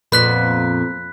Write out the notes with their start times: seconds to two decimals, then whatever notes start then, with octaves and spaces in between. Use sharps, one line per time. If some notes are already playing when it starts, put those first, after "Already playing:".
0.12 F2 A#2 B3 B5 F#6 B6